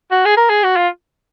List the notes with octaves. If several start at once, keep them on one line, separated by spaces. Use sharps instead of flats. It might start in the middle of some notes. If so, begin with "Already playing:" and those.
F#4
G#4
A#4
G#4
F#4
F4